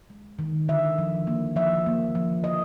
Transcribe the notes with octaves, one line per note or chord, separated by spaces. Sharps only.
G#3
D#3
D3 E5
F3
A#3
F3 E5
A#3
F3
D3 D#5